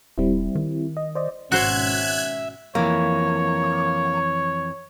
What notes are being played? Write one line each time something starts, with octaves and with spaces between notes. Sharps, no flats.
D#1 G3 C4 E4
D#3
D#5
C5 D5 D#5
G#1 B2 C#4 F#4 C5 E5 F#6 G#6
F2 E3 A#3 C#5